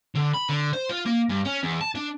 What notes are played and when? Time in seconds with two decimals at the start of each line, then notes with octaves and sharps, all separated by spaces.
0.15 D3
0.34 B5
0.49 D3
0.73 C5
0.90 F4
1.06 A#3
1.30 G2
1.46 C#4
1.63 E2
1.81 A5
1.95 D4